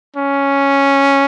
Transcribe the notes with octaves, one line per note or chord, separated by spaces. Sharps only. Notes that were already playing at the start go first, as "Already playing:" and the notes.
C#4